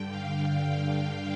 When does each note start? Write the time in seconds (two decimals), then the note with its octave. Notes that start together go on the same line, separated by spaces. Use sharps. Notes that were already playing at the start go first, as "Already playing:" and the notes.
Already playing: G2 D3 G5
0.09 F5
1.06 G5